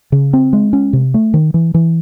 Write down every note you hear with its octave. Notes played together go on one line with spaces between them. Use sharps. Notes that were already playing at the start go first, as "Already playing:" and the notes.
C#3
C4
G#3
C#4
C3
A3
D#3
E3
E3